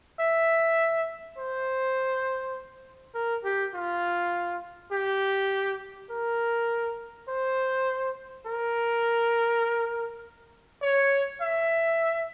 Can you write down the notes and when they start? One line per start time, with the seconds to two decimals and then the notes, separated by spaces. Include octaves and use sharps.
0.20 E5
1.38 C5
3.14 A#4
3.44 G4
3.74 F4
4.92 G4
6.10 A#4
7.28 C5
8.46 A#4
10.82 C#5
11.41 E5